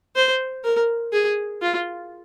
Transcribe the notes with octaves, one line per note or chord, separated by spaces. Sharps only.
C5
A#4
G#4
F4